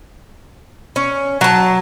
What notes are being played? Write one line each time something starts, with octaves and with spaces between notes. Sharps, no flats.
C#4
F#3 A5